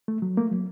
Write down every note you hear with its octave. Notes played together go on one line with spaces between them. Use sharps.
A3
F#3
A3 A#3
F#3